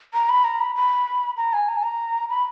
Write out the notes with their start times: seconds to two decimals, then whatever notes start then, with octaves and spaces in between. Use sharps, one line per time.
0.14 A#5
0.29 B5
0.44 A#5
0.60 B5
0.75 B5
1.37 A#5
1.53 G#5
1.69 A#5
1.76 G#5
1.83 A#5
2.29 B5